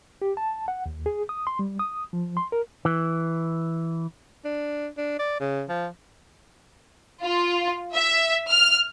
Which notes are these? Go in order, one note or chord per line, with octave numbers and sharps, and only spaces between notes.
G4
A5
F#5
D#2
G#4
D#6
C6
G3
D#6
F3
C6
A#4
E3
D4
D4
D5
C#3
F3
F4
E5
F6